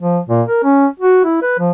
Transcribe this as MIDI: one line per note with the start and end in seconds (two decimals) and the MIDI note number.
0.01 0.19 53
0.29 0.42 46
0.48 0.62 70
0.64 0.86 61
0.99 1.21 66
1.25 1.41 64
1.42 1.58 71
1.59 1.72 53